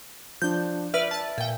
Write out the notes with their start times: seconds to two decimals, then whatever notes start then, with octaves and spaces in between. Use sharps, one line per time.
0.42 F3 D4 G6
0.94 B4 D5 E5 F6
1.11 A5 A6
1.38 A#2 G5